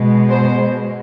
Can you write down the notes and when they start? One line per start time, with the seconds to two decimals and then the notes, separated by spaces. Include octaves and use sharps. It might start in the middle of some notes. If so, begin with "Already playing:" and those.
Already playing: B2 G#3
0.29 C5